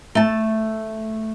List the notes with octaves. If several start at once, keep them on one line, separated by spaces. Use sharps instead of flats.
A3 A5